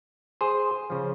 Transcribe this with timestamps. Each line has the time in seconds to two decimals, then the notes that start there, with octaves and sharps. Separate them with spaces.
0.41 G#4 C5
0.90 C#3 F3